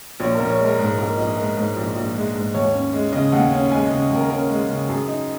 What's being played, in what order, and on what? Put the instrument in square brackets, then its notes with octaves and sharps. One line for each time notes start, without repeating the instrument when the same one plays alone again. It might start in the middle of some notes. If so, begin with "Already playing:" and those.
[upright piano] A#1 C#5
A#4
A#1
C#5
G#3
A#4
G#2 A#4
A#1 A#4
A#1 D#5
G#3 A#4
G#2
A#1
A#1
G#3
G#2
D#2 C#5
C#4
G#3
C#3 D#5
D#2 F#5
C#4
G#3 G#5
D#5
C#3
D#2 A#4
C#4 A#4
G#3
C#3
F#2 G#4
D#4